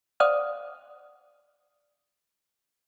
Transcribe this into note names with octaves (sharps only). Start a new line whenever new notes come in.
C5 D5 F5 F#5 D#6 F6